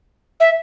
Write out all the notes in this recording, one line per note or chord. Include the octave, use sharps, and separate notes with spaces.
E5